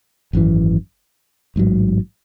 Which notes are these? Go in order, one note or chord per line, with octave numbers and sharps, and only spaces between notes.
G#1 F#2 C#3 E3
A1 G#2 F#3